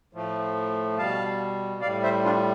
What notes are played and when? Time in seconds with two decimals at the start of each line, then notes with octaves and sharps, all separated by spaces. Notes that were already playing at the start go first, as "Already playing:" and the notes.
0.13 A2 F3 A3
0.98 B2 G3 F5 A5
1.81 A2 G3 D5 F5
2.03 C5 E5
2.25 D4 F4